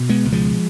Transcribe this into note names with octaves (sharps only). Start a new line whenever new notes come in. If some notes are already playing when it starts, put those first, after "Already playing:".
Already playing: B2
G#3 B3
C#2
F3 G#3